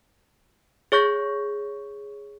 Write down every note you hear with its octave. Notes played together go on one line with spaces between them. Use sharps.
G#4 C#5 C#6 G6 A#6